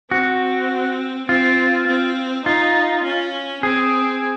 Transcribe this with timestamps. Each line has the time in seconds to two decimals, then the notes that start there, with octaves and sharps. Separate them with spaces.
0.11 C4 F#4
1.29 C4 F4
1.87 C4
2.46 D#4 F4
3.04 C#4
3.63 C4 G#4